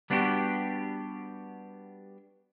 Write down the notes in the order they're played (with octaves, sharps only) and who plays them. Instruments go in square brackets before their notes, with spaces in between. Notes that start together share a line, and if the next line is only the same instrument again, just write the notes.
[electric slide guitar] G3 B3 D4 F#4 G4